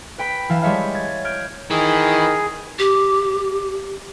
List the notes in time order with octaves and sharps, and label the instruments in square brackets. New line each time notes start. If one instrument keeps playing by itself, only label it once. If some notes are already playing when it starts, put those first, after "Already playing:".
[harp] B4 G5 B5
E3 F5 A5
G3 G#3 C#5 E5 F5
G#6 A6
F6 G6 G#6 D7
[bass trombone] D#3 [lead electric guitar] E3 [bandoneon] G#4
[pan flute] G4